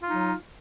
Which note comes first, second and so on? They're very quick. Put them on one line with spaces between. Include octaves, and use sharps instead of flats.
F4 D#4 F#3